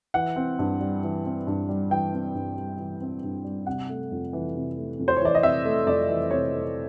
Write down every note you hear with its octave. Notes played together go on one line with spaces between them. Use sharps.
E3 F#5
C4
G2
G3
E3
C4
G2
G3
E3 G5
C4
G2
G3
E3
C4
G2
G3
C3 F#5
A3
F2
E3
C3
A3
F2
C5
C#5
E3 D5
D#5
C3 E5
A3
F2 D5
E3
C3 C#5
A3